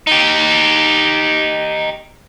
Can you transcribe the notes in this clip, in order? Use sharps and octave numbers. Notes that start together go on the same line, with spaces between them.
D#4 G4